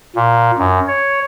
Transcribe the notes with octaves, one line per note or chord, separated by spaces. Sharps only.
A#2
F#2
C#5